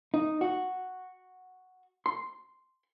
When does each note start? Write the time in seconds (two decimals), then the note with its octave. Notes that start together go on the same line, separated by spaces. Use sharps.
0.14 D#4
0.41 F#4
2.06 C6